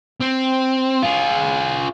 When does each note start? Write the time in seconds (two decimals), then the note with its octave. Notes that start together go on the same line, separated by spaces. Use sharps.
0.20 C4
1.03 F4 G#4